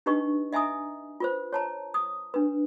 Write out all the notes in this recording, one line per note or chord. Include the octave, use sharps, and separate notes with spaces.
D4 D#4 G4 B4 D#5 C#6
D#5 E5 G#5 A#5 D#6
F4 B4 C5
C#5 A5 A#5
D#6
D4 B4